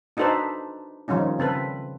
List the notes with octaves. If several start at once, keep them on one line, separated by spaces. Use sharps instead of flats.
D4 D#4 F#4 A4 B4 C5
D#3 F3 G3 C#4 D#4
C#3 C4 A4 B4